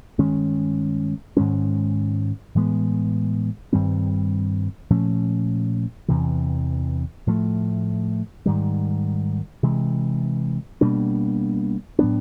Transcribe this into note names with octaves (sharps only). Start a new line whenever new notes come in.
G2 D#3 G#3 C#4
G#2 D#3 G#3 C#4
A2 E3 G#3 B3
G2 D#3 G3 C4
A#2 F3 A3 C#4
E2 C3 E3
A2 F3 A3
G#2 D#3 G3
C3 E3 G#3
B2 G3 A#3 D4
A2 F#3 B3 D4